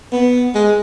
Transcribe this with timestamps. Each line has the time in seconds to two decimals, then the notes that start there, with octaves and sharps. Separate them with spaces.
0.12 B3
0.55 G#3